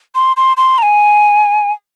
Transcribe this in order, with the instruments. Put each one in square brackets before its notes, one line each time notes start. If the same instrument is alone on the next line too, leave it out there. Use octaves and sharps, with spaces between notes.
[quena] C6
C6
C6
A#5
G#5